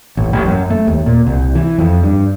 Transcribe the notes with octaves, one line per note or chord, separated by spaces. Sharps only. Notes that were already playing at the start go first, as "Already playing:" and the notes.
A1
A1
F#2
A3
D#2
A#2
C2
E3
F2
G2